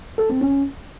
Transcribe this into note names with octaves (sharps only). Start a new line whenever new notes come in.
A4
C4
C#4